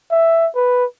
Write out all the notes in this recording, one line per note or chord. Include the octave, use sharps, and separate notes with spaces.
E5
B4